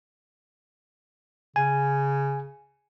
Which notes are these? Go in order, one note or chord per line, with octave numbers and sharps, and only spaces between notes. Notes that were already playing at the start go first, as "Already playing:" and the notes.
C#3 G#5